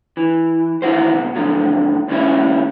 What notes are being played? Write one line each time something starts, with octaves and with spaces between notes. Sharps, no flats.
E3
D#3 E3 E4 F#4 C5
C#2 B2
F2 G#2 D3 F3 F#3
D#2 C#3 G3 C#4 E4